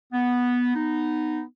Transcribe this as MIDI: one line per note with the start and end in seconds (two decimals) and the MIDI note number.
0.13 0.73 59
0.76 1.42 59
0.76 1.42 63